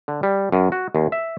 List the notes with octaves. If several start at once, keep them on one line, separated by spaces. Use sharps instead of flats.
D3
G3
F#2
F#4
D#2
E5